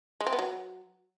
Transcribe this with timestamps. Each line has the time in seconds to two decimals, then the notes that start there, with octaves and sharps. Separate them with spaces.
0.21 G#3
0.27 C4
0.33 B3
0.39 F#3